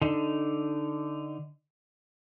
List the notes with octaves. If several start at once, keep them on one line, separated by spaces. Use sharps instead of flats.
D3 D#4